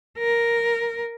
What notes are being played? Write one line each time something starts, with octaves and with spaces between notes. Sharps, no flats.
A#4